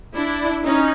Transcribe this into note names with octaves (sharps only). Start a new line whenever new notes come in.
D4 E4
C#4 D#4